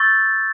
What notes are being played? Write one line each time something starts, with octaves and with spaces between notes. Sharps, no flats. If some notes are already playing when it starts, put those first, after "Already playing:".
Already playing: C#6 E6 G6 A6